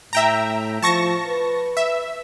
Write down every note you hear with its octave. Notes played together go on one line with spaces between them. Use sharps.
A2 E5 G5 A#5
F3 A5 C#6 A#6
B4
E5